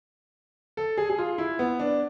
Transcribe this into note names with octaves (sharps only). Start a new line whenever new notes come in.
A4
G#4
G#4
F4
E4
B3
D4